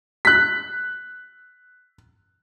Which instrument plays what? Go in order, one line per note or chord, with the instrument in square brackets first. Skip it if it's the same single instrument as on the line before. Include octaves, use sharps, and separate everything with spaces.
[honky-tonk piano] F#6 B6